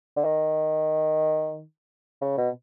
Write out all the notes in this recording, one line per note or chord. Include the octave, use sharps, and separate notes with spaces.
D3
D#3
C#3
B2